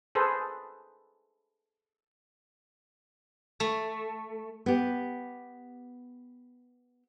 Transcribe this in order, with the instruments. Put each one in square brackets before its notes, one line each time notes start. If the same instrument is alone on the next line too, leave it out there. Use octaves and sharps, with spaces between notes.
[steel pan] G#4 A4 B4 C5
[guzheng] A3
[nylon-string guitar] B3 G4